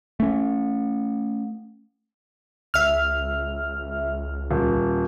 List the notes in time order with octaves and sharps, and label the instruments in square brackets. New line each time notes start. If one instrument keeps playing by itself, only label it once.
[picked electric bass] A3 C#4
[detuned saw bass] C#2 [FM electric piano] E5 F6
[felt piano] D#1